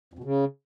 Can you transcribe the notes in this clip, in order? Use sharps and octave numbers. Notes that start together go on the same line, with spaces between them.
F2
B2
C#3